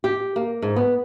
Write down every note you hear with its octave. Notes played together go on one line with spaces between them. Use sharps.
G4
A#3
G#2
B3